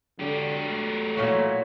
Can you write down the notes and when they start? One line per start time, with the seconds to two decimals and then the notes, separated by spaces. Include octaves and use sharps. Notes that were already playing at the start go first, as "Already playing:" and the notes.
0.20 D3 F#3 G4
0.68 A3
1.17 A#2 E4 F#4 C#5